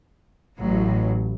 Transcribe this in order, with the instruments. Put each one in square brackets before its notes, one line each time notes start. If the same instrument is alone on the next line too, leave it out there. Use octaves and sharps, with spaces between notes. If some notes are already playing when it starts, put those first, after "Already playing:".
[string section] A1 A2 F#3